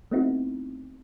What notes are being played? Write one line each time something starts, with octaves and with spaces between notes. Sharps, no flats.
A3 B3 C4 D#4 E4 F#4